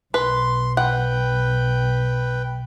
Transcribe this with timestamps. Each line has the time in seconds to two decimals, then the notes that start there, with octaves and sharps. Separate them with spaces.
0.14 B1 B4 C6
0.77 B4 F#5 G5